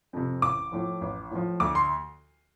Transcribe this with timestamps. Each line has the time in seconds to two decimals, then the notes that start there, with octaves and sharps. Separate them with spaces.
0.13 F2 C3
0.42 A1 D6
0.72 A2 F3
1.01 A1
1.31 A2 F3
1.60 D2 D6
1.75 C6